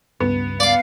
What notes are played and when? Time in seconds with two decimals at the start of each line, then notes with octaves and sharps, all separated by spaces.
0.20 C#2 G2 B3
0.60 D5 F5 D6